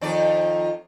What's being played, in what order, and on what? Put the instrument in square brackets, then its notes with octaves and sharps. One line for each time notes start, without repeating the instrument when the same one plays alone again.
[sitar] F2 D#3 D5